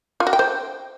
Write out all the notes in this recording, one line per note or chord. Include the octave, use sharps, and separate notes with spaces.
F4
F#4
G5
C5